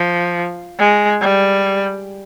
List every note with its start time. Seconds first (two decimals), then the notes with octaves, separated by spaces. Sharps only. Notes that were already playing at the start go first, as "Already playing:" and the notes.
Already playing: F3
0.79 G#3
1.21 G3